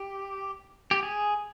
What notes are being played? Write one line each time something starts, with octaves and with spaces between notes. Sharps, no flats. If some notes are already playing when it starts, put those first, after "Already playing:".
Already playing: G4
G4
G#4